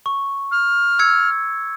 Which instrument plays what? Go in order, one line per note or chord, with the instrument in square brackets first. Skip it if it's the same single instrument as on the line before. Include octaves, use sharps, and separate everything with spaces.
[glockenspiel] C#6
[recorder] F6
[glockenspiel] E6 G#6 C#7